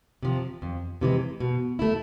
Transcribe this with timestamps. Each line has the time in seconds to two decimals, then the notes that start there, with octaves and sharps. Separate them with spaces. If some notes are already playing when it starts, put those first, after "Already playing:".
0.23 C3 F3
0.62 F2
1.01 C3 E3 G#3
1.40 B2
1.79 A3 E4